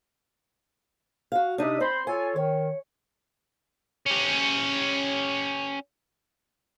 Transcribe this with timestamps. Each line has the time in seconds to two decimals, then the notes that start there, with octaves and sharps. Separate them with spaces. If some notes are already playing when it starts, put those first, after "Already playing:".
1.32 F#4 F5
1.58 C3 D4 D#4 E5 D#6
1.80 C4 C5 B5 C6
2.07 F4 A4 C#5 G#5
2.36 D#3 C#5
4.06 C#4 G4